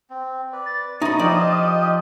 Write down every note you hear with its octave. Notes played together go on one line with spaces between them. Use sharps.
C4
B4 D5
A6
D#4 C#5 D#5 E5 B5 D#6
F3 F4 G4 D5 D#5 A5